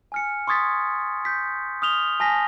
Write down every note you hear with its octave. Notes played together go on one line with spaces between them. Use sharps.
G#5 F6 C#7
C6 C#6 D#6 G#6 A6 B6
G6 B6
D#6 F6 F7 G7
G#5 A5 A#6 B6